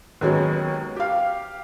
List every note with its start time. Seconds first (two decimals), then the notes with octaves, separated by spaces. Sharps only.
0.21 D#2 F#3 G#3 B3 C#4
0.96 G4 F5